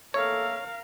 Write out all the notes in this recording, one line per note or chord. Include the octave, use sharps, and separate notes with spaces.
A3 A#3 A4 A#4 C#5 F5